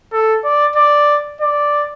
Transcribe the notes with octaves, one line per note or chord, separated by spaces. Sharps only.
A4
D5
D5
D5